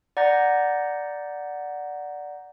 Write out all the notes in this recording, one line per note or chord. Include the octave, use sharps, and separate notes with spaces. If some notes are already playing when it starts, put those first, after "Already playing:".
D5 F#5 A#5 G6 A#6